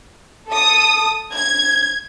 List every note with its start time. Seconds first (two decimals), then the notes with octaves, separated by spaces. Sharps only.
0.50 A4 D#6
1.33 G#6